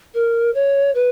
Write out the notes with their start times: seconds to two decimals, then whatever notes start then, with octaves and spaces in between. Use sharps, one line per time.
0.14 A#4
0.54 C#5
0.95 B4